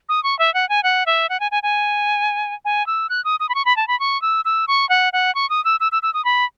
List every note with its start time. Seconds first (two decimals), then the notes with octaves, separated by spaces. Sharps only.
0.09 D#6
0.24 C#6
0.39 E5
0.54 F#5
0.69 G#5
0.83 F#5
1.06 E5
1.29 F#5
1.40 G#5
1.51 G#5
1.63 G#5
2.65 G#5
2.87 E6
3.10 F#6
3.25 D#6
3.40 D#6
3.49 B5
3.55 C#6
3.65 B5
3.77 A5
3.88 B5
4.00 C#6
4.22 E6
4.45 E6
4.68 C#6
4.89 F#5
5.13 F#5
5.35 C#6
5.50 D#6
5.65 E6
5.80 E6
5.92 E6
6.03 E6
6.14 D#6
6.25 B5